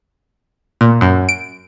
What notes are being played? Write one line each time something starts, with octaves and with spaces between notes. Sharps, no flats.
A#2
F#2
D7